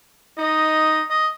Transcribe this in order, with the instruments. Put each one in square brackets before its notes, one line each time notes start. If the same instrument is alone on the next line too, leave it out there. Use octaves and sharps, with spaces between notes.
[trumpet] D#4 [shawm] D#5
[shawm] D#5